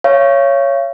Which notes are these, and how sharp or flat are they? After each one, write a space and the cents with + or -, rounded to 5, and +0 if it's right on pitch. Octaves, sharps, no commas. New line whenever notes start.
C#5 +0 F5 -40